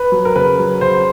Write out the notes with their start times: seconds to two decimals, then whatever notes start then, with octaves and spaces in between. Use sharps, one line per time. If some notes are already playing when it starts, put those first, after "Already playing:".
Already playing: B4
0.12 F#3
0.25 A#4
0.36 C#3 B4
0.59 F#3
0.81 C#3 C5